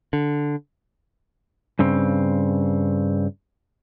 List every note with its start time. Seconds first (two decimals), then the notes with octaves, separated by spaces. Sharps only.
0.13 D3
1.79 G2 C#3 C4